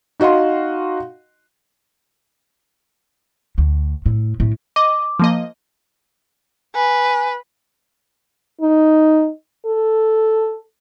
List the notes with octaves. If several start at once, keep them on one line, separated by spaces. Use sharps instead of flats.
D#4 F#4 D#5 F5 C6
D2
A2
A2
D#5 D6
F3 A#3 D#5
B4 G#5
D#4
A4